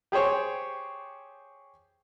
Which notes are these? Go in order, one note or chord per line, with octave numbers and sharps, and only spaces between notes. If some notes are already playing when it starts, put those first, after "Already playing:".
G4 G#4 C5 C#5 G5